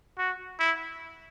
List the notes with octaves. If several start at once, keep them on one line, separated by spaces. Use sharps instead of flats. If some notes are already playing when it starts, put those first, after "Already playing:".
F#4
E4